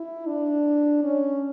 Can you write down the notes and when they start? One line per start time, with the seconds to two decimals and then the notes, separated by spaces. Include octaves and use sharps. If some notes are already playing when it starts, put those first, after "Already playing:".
Already playing: E4
0.27 D4
1.03 C#4